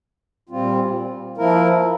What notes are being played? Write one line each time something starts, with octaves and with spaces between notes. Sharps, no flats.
A#2 G3 C4 F4
F3 A#3 E4 A#4